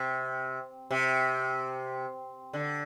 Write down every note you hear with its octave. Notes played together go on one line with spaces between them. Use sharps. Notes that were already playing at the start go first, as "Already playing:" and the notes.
Already playing: C3
C3
D3